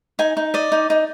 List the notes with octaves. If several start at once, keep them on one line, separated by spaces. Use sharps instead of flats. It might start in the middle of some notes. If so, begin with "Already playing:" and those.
D#4 G#5
D#4
D5 D#5
D#4
D#4